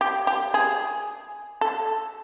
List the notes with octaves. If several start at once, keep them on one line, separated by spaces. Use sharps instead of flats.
G4
G4
G#4
A4